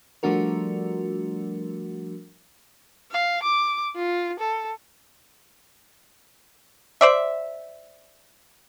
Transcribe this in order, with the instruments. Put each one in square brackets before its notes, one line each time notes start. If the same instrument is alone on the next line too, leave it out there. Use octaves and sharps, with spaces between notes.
[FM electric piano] F3 G3 A3 D4 F#4 A#4
[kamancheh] F5
D6
F4
A4
[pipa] C5 D5 E5